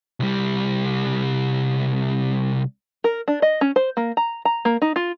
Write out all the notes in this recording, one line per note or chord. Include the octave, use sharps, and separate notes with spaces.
C2 G3
A#4
D4
D#5
C#4
C5
A#3
A#5
A#5
A#3
D#4
F4